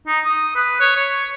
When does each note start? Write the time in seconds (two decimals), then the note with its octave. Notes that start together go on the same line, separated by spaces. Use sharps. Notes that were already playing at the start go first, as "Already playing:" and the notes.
0.07 D#4
0.25 D#6
0.56 B4
0.80 C#5
0.97 C#5